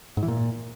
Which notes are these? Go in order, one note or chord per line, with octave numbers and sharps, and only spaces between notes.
G#2
E3
A#2